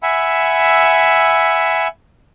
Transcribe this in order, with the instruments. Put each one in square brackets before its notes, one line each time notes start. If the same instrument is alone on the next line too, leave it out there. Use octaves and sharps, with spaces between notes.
[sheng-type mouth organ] E5 F#5 G#5 B5 E6